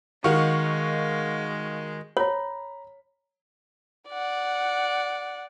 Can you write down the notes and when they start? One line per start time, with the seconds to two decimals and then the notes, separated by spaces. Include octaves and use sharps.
0.24 D#3 G#3 F#4 F5 C#6
2.17 C#5 A#5 B5
4.09 D5 F#5